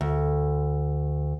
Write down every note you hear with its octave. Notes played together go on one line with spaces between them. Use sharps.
D2